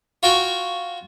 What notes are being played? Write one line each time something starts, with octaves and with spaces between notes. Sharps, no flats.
F4 F#4 G5 G#5